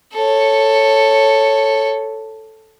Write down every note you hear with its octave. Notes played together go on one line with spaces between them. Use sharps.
A4 C#5